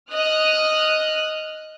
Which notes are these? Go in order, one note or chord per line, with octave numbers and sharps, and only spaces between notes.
D#5 D#6 F6 F#6